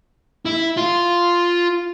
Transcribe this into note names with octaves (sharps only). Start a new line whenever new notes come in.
E4
F4